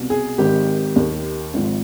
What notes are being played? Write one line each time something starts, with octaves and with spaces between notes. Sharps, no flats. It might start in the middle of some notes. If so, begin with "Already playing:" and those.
Already playing: C2 B2
G#4
G#1 G#2 D#3 G4
D#2 D#3
G#1 G#2 F3